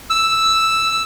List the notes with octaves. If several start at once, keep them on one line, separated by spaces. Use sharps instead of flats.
E6